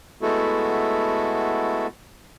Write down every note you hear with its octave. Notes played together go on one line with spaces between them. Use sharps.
G#3 A3 B3 E4 F#4 A4